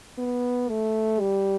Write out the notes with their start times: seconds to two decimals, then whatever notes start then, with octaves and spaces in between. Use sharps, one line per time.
0.18 B3
0.69 A3
1.20 G3